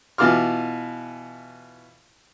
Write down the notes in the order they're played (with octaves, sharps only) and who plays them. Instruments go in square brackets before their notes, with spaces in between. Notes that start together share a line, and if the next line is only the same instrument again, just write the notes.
[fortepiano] B2 E3 F4 D6 F6